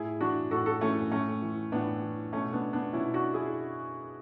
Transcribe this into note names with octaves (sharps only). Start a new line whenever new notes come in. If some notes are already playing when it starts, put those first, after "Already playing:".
Already playing: A2 E4 G#4
E3 D4 F#4
A2 F#4 A4
F#4 A4
E3 A3 C#4
A2 A3 C#4
E3
A2 B3 D4
E3
B2 A3 C#4
B3 D4
B3 D4
B2 C#4 E4
D4 F#4
E4 G#4